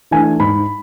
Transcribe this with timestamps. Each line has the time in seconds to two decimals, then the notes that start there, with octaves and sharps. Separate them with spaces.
0.11 E3 A3 D4 G#5
0.40 G#2 B5